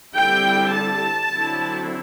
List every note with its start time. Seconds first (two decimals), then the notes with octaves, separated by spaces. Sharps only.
0.14 D3 G3 C4 E4 G5
0.72 A5
1.31 D3 F#3 C4 E4